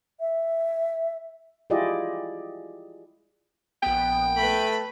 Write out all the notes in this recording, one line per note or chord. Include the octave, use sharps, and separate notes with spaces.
E5
E4 F4 G4 G#4 D5 D#5
A#1 B3 G5
A3 B4 B5